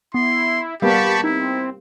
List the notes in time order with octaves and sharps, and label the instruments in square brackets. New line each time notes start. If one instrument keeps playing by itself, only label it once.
[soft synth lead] B3 [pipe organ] E4 [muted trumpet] C6
[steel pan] G3 A#3 B3 [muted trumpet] G4 [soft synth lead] F5 [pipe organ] A5 B5 C#6
[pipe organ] C4 [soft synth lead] D#4 [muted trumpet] E4